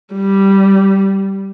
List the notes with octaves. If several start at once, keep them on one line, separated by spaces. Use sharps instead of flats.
G3